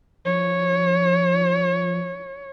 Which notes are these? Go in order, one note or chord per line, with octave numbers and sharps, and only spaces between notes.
F3 C#5